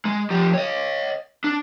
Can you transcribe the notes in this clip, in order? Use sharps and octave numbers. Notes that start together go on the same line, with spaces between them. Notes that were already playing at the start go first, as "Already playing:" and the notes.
G#3
F3 G4
C#5 D#5
D4